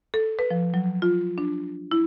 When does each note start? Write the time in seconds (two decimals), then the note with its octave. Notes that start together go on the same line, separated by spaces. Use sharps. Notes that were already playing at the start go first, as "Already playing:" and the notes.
0.14 A4
0.39 B4
0.50 F3
0.74 F#3
1.02 F4
1.38 D4
1.91 E4